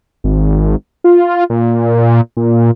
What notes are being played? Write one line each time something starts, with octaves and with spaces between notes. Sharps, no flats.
G#1
F4
A#2
A#2